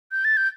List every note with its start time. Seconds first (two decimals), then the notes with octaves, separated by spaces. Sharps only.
0.12 G6
0.25 A6
0.37 G6